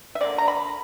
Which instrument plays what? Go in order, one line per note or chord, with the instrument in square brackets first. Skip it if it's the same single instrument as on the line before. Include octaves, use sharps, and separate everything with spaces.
[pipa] E5
D3 A#3 C#4 D5
A#5
B5